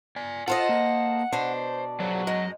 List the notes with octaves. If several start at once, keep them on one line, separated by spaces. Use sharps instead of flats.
D5 G#5
F4 A4 C5 D#5 F#5
A#3
B2 D4 C5
F#3 G#4 C5 D5
F#2 G#3 D#5